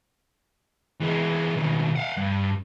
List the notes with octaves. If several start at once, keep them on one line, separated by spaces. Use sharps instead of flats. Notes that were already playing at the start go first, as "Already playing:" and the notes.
E3 G#3
D#2 B2
F5 F#5
G2